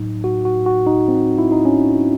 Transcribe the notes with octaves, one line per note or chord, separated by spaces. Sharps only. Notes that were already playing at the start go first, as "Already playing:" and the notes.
Already playing: A2 F#3 D#4
F#4
F#4
F#4
D#4
C4
E4
D#4
C#4